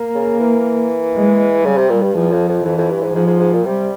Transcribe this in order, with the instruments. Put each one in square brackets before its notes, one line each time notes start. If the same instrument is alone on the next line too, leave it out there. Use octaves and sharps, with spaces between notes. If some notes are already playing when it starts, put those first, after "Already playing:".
Already playing: [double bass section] A#3
[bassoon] C#3
E3
[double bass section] G#3
[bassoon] C#3 [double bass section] G3
[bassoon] C3
A#2
G2
[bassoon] E2 [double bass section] F3
[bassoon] F2
F2
[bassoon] F2 [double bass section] E3
[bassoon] F2
G2
G#2
[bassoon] G#2 [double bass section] F3
[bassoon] G#2
G#2
A#2
[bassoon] C3 [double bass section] G3